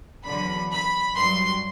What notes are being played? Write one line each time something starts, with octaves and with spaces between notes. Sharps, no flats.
E2 D3 F#3 B5
B5
G2 F#3 C6